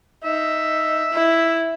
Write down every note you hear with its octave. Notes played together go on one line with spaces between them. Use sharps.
D#4 E5
E4